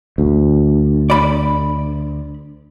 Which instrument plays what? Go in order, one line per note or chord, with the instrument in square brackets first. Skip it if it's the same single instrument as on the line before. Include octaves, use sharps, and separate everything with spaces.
[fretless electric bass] D2
[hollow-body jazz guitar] D5 B5